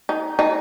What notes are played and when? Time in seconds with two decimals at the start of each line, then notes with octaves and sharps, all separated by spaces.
0.09 D#4
0.39 D#4